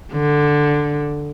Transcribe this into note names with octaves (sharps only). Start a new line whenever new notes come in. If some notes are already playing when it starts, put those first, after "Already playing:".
D3